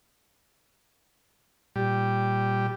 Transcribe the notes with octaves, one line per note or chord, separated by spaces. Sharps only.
A#2 G3